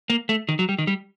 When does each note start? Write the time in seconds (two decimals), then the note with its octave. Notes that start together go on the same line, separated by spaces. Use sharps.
0.10 A#3
0.29 A3
0.49 D#3
0.59 F#3
0.69 G3
0.78 D#3
0.87 G3